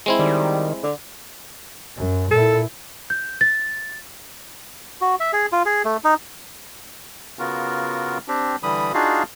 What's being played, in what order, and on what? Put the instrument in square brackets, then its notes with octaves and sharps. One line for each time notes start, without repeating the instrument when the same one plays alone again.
[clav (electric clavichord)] G#3 C4 E4
[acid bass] D#3 [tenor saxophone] G3
[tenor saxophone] D3
[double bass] F#2
[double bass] A#2 E4 [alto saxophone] A4
[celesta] G6
A6
[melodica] F#4
E5
G#4
F4
G#4
A3
D#4
[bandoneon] C#3 B3 F4 F#4 A#4
C4 D4 G4
D3 E3 G3 B5 D#6
D4 D#4 F4 F#4 G#4 F5